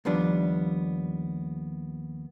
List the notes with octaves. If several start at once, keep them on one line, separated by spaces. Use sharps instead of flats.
D#2 F3 G3 B3 D4